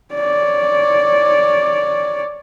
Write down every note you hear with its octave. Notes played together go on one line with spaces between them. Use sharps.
C#5 D5